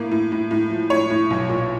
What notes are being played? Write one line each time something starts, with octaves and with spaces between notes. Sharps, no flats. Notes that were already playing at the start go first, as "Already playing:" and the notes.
Already playing: A2 A#3
A2
A2
A2
F3
A2 C#5
A2
B1
A#2